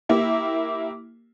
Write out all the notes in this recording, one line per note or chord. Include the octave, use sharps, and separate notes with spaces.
A#3 E4 G4